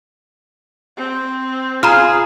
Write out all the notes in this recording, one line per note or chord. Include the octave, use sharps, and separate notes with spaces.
C4
F4 G#4 A#5 B5 F6